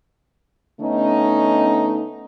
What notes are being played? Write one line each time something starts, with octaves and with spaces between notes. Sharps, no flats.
D3 A3 B3 C#4 D#4